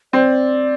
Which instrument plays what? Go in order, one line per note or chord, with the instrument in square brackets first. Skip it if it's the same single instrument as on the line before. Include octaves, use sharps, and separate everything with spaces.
[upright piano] C4 [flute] D5